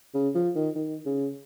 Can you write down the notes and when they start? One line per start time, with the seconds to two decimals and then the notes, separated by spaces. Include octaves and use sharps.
0.15 C#3
0.35 F3
0.56 D#3
0.75 D#3
1.06 C#3